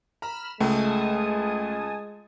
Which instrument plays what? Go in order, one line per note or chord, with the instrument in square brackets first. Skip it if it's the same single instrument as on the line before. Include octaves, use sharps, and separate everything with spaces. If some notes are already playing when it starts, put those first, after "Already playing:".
[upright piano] A#5 [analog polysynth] B5 F6 E7
[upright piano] C#2 [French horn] G#3 [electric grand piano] A3 [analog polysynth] G#5 A5 D#6